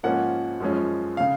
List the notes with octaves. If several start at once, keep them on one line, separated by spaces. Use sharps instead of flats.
G#2 F3 A#3 C#4 F#5
F#2 F3 G#3 C#4
C#3 F5